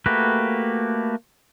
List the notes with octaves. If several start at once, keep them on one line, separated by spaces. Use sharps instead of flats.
A3 A#3 F#4 G4 B4